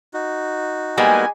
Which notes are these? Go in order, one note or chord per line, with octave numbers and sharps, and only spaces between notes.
D#4 F#4
G3 G#3 A#3 B3 G#5